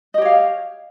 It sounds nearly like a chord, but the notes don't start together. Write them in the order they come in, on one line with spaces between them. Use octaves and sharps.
D#5 G4 C#5 F5